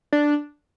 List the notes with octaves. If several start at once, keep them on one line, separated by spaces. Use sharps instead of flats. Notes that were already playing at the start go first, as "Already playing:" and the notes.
D4